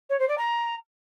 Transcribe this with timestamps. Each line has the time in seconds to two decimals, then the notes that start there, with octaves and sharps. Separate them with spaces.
0.09 C#5
0.19 C5
0.28 D5
0.38 A#5